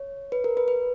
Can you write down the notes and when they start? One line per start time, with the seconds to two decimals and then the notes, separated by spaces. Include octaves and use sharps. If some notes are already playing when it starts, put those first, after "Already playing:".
Already playing: C#5
0.32 B4
0.44 A#4
0.57 B4
0.68 B4